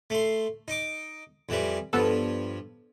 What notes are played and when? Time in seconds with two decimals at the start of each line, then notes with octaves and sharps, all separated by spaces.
0.10 A3 C6
0.68 D#4 D6
1.49 F2 E3 G3
1.93 G2 F3 B3 A4